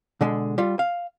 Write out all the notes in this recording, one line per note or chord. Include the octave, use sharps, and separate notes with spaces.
B2 D3 G#3
G3 F4
F5